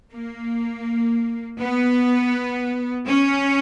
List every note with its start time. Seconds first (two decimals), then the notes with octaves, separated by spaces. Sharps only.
0.12 A#3
1.60 B3
3.07 C#4